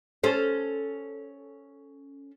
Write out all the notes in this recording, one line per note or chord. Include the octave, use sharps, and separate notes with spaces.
C#4 A4 C5